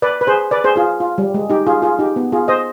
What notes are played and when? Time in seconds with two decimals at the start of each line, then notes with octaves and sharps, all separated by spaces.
0.02 B4 D5
0.21 B4
0.27 G#4 C5
0.51 B4 D5
0.64 G#4 C5
0.76 F4 G#4
1.00 F4
1.18 G3
1.34 G#3
1.50 D#4 G4
1.67 F4 G#4
1.82 F4 G#4
1.99 D#4 G4
2.16 B3
2.32 F4 G#4
2.48 C5 D#5